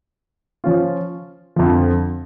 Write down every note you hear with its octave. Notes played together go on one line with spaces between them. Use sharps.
F3 C#4 F4
F2 D3 F3